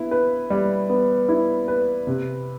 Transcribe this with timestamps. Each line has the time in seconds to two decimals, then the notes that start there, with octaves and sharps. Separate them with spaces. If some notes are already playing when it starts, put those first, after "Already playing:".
Already playing: B3 E4
0.11 B4
0.50 G3
0.89 B3
1.29 E4
1.68 B4
2.07 C3